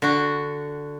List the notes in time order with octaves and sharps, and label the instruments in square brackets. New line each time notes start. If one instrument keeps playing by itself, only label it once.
[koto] D3 F#4